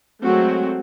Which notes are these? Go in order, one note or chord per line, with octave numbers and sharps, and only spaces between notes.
F#3 G#3 A3 C4 F#4